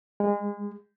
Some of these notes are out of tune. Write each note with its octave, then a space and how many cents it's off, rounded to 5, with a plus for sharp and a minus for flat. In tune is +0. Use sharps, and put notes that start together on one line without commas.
G#3 -30